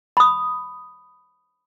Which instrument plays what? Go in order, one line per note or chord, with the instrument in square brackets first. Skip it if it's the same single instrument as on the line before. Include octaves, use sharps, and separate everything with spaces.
[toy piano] B5 D#6